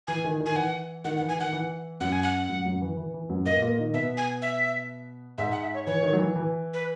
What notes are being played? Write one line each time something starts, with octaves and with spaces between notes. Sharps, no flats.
E3 G#5
D#3
D#3
G#5
E3 F#5
D#3 F#5
F#5
E3
G#5
D#3 F#5
E3
F#2 F#3 F#5
G#5
F#5
F#2 F#3
F#2 F#3
E3
E3
E3
F#2 F#3
A#2 A#3 D#5
B3
A#2 A#3
D#3 D#4
B2 B3 E5
G#5
E5
G#2 G#3 E5
F#5
E5
C#5
E3 C#5
D#3
F#3
E3
E3
B4